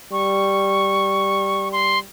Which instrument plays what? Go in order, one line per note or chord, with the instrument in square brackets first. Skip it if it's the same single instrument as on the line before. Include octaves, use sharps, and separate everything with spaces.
[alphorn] G3 [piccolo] C#6
[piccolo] C6